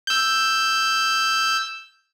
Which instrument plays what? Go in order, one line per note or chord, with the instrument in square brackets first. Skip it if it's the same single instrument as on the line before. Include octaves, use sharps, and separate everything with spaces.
[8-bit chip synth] E6 G6